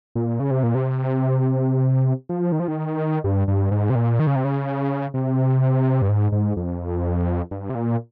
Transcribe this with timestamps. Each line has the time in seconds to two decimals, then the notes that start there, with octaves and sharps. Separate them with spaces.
0.15 A#2
0.40 C#3
0.51 C3
0.63 A#2
0.75 C3
2.29 F3
2.52 D#3
2.60 F3
2.68 D#3
3.24 G2
3.48 G2
3.71 G#2
3.90 C3
3.95 A#2
4.19 D#3
4.27 C#3
4.36 C3
4.45 C#3
5.14 C3
6.02 G2
6.09 G#2
6.32 G#2
6.57 F2
7.51 G2
7.70 C3
7.75 A#2